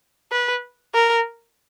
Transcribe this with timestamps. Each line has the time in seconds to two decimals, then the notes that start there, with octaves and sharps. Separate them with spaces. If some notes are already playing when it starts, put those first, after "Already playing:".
0.32 B4
0.94 A#4